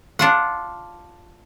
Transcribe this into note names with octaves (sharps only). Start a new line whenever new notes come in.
D4 F4 F#5